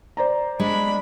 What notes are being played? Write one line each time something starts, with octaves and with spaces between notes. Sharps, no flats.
C5 D5 A#5
G#3 D4 B5